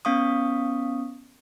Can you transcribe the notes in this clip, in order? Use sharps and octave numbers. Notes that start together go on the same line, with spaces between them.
B3 C#4 F5 C#6 D#6